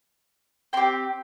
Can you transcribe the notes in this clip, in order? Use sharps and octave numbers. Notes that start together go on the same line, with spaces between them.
C4 G4 G5 C6